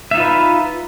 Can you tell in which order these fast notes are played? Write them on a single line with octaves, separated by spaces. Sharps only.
E5 D#4 F4 B4